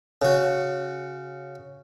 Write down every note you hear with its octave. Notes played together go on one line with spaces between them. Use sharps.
C#3 F#4